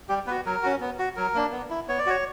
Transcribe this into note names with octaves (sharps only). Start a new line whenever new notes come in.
G3 G4
B3 F#4 B4
F#3 A#4
C#4 F#4
B3
F#4
F#3 A#4
A#3 D4
B3
E4
B3 C#5
D5
F#4 C#5